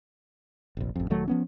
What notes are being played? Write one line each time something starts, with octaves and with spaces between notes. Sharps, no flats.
F1 A#1
A1 F2
D#1 D#3 F#3 A3
F3 B3 C#4